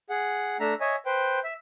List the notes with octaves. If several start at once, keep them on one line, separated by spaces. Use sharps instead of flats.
G#4 F#5
A3 D4 E5 A#5
C#5 D#5 E5 G#5
B4 C5 G5
E5